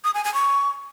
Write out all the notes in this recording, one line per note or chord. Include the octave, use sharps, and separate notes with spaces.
D#6
G#5
G#5
C#6